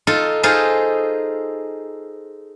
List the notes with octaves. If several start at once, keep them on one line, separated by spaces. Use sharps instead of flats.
D#4 F4 A4
D#4 F4 G#4 A4 C5 F5